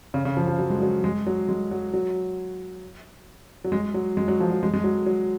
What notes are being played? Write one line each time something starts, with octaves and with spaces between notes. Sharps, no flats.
C#3
C#3
F3
F3
F#3
G#3
F#3
G#3
F#3
G#3
F#3
F#3
F#3
G#3
F#3
G#3
F#3
F3
F#3
G#3
G#3
F#3
F#3